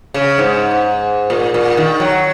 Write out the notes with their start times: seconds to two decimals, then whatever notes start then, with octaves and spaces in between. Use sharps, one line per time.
0.14 C#3
0.38 G#2
1.30 A#2
1.54 A#2
1.77 D#3
2.00 F#3